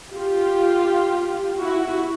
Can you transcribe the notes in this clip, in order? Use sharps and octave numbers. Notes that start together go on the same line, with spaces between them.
F4 G4
E4 F#4